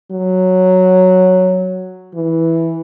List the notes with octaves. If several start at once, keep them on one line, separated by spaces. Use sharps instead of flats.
F#3
E3